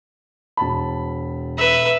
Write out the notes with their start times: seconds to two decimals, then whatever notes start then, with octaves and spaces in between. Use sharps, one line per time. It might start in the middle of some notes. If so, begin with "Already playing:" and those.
0.57 E1 A5 B5
1.58 B4 E5